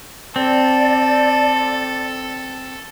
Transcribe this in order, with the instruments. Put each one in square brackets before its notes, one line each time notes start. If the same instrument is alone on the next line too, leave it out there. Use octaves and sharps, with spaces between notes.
[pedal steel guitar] C4 [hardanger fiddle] A4 [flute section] D5